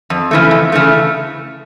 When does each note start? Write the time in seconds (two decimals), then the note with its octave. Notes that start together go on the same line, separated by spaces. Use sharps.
0.10 F2
0.31 C#3 E3 A3
0.51 F2
0.72 C#3 E3 A3